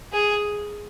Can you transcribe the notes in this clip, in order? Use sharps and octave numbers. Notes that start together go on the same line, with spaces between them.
G#4